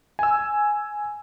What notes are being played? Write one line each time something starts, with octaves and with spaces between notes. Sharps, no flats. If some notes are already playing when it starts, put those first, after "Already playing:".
G#5 E6